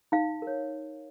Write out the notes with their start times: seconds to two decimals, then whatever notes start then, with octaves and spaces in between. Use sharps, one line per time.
0.12 D#4 F5
0.42 A#4 C#5